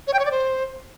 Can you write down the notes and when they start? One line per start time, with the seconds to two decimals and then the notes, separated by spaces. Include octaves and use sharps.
0.07 C#5
0.13 G5
0.19 C#5
0.25 D5
0.31 C5